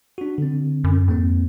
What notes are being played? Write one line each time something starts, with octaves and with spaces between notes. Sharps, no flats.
D4 F#4
D3 C4
F#2
F2 G#2 A#3 C4